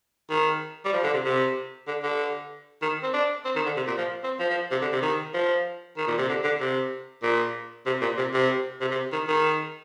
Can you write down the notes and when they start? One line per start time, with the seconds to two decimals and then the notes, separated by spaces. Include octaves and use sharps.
0.30 D#3
0.85 G3
0.93 F3
1.03 D3
1.13 C3
1.24 C3
1.87 D3
2.03 D3
2.82 D#3
3.03 C4
3.13 D4
3.45 C4
3.55 D#3
3.66 D3
3.76 C3
3.87 A#2
3.98 F3
4.23 C4
4.39 F3
4.50 F3
4.71 C3
4.81 D3
4.92 C3
5.02 D#3
5.34 F3
5.97 D#3
6.08 A#2
6.18 C3
6.29 D3
6.44 D3
6.60 C3
7.23 A#2
7.86 C3
8.01 A#2
8.17 C3
8.33 C3
8.81 C3
8.91 C3
9.12 D#3
9.28 D#3